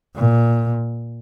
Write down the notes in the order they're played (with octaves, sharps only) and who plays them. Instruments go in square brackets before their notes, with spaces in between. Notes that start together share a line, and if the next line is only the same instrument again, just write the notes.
[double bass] A#2